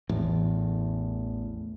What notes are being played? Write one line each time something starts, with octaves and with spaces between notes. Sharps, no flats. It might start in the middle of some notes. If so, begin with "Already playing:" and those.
A1 E2 A2